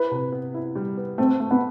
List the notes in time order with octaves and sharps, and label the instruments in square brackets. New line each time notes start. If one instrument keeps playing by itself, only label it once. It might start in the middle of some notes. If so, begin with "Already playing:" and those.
Already playing: [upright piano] E4 [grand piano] B4
[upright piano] C3
B3
E4
G3
B3
[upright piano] A3 [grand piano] C4
[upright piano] A3
[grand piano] B3